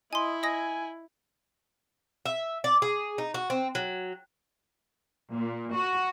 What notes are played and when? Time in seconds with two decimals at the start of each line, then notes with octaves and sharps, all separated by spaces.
0.13 E4 D#5 G#5 C6
0.43 D#5 G#5 D#6 A#6
2.26 E5
2.64 D5
2.82 G#4
3.18 D#4
3.34 F#4
3.50 C4
3.75 F#3
5.33 A#2
5.74 F#4